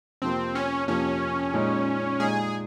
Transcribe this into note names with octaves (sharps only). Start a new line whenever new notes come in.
F2 C3 F3 A#3 C4
C#4
F2 C3 F3 A#3 C#4
A#2 G#3 D#4
A#2 G#3 D#4 G#4